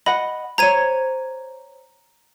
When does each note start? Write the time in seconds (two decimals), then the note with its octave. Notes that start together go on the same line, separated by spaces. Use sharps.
0.06 D#5 F#5 B5
0.58 C5 C#5 A#5 G#6 D#7